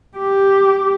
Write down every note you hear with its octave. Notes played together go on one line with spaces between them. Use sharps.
G4